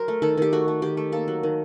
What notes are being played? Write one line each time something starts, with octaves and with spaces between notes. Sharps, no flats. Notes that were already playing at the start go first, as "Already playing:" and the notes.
Already playing: F#3 A#4 C5
A3
D#3 A4
D#3 G4
A3 F#4
A3
D#3 G4
A3
A#3 A4
F#3
D#3